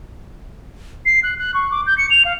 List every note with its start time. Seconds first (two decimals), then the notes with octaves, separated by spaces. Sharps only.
1.06 C7
1.23 F#6
1.38 F#6
1.54 C#6
1.71 D6
1.87 G6
1.98 C#7
2.10 F7
2.25 F5